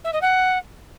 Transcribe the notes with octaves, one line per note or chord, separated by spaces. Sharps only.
E5
D#5
F#5